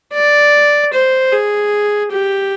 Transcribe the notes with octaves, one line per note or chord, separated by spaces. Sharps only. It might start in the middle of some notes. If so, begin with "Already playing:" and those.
D5
C5
G#4
G4